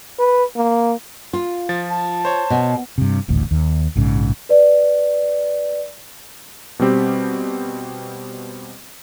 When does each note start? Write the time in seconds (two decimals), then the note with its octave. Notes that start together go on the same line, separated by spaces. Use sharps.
0.19 B4
0.56 A#3
1.33 F4
1.69 F3 A6
1.89 A5
2.25 C5 C#5
2.50 B2
2.98 G2 C3
3.28 D#1 A1 D2
3.51 D#2
3.96 A#1 G#2 C#3
4.49 B4 D5
6.79 B2 G3 C4 G4